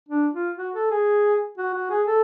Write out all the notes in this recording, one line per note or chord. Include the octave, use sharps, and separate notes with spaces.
D4
F4
F#4
A4
G#4
F#4
F#4
G#4
A4